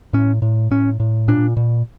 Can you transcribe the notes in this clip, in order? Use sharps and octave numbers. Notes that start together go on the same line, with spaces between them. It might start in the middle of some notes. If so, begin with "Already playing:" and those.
A2 C#4
A2
A2 C#4
A2
A#2 D4
A#2